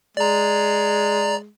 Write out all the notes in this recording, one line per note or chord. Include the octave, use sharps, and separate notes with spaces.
G#3 D5 A#5